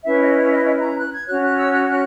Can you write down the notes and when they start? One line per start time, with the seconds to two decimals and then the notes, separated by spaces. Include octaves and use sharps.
0.05 C#4 E4 B4 E5
0.21 D#5
0.36 C#5
0.51 D#5
0.66 D#5
0.82 A#5
0.97 F#6
1.12 G#6
1.27 C#4 F#4 C#5 F#6
1.42 F#6
1.57 E6
1.74 F#6
1.88 F#6